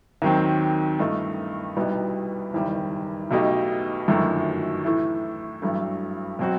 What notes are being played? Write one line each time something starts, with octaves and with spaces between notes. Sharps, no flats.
D#2 D#3 F#3 C4
G2 E3 A3 D#4
C2 B2 G3 B3 D#4
F#1 E2 D#3 G3
B1 B2 A3 D#4 G4
G1 F#2 D#3 F#3 A3
A2 E3 A3 E4
A1 G2 F#3 A3
B2 F#3 C4 F#4